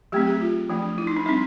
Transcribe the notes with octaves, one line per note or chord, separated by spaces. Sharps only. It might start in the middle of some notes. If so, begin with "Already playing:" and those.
F#3 A3 C4 G4
G#4
F4
F3 A3 D4
E4
D#4
D4
G3 C4 D#4